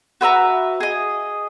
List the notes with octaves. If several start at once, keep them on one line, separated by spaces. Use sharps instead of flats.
F#4 B4 E5 A#5
G#4 D#5